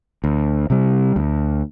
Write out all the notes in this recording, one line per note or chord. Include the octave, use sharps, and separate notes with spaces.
D2
C3 G3
D2